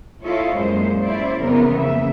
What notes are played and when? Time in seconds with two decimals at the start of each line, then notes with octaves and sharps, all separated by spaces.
0.22 E4 F4 A4 C#5 D#5
0.54 F#2 A#2 G#3 A#3 C5
1.02 C#4 E4 C5 D5
1.40 F2 C#3 E3 B3 A#4
1.77 C#3 A#3 E5